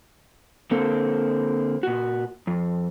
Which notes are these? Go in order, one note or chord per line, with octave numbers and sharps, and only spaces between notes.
D3 A#3 C4 A4 A#4
A#2 F#4
F2